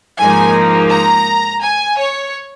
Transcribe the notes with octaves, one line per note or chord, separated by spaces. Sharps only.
G#2 F3 A#3 D#4 G#5
A#5
G#5
C#5